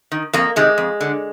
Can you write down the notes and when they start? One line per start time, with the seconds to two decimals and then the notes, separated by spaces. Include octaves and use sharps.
0.12 D#3
0.33 F2 A#3
0.56 C3 D#3 G#3
0.78 F2
1.01 D3